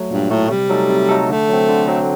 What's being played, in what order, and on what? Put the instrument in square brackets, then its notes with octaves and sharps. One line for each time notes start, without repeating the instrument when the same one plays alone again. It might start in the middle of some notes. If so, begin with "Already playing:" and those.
Already playing: [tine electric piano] F#3 A3
[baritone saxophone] G2 [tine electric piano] A#2
[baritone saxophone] A2 [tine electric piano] F#3 A3
[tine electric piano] C3 [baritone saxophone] G3
[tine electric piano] F#3 A3 D#4 A4
C3
F#3 A3 D#4 A4
[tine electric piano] D3 [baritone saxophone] A3
[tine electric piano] F#3 C4
D3
F#3 C4